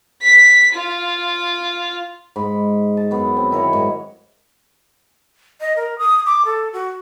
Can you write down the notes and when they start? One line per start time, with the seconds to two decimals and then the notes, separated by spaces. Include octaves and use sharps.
0.22 B6
0.73 F4
2.36 G#2 B5
2.97 A5
3.11 F#2 B3
3.37 C4
3.51 D#3 E4 A#4 C#5
3.73 G#2
5.60 D#5
5.76 A#4
5.98 D#6
6.26 D6
6.45 A4
6.73 F#4